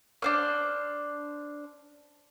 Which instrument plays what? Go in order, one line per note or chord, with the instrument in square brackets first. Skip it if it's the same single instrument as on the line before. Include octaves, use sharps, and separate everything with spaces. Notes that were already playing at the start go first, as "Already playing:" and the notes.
[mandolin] D4 C5 F6